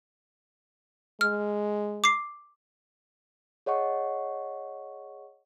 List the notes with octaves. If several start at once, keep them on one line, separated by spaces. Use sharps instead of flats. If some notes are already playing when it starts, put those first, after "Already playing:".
G#3 F6
D6 C7
G#4 C#5 D#5 F#5 C#6